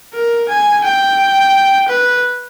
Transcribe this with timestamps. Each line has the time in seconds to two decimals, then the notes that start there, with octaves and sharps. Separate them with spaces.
0.14 A#4
0.49 G#5
0.84 G5
1.88 B4